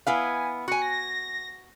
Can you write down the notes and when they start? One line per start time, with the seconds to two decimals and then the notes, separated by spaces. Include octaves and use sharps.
0.07 B3 E4 F5 G#5
0.68 F#4 G#5 C#7
0.82 A#6